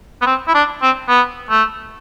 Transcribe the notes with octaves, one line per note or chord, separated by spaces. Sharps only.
B3
C4
E4
D4
C4
B3
A3